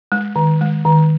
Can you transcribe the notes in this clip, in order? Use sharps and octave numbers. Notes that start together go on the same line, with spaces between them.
G#3
D#3
G#3
D#3